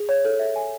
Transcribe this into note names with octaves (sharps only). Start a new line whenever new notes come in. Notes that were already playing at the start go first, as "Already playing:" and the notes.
Already playing: G#4
C#5
A4
E5
G#5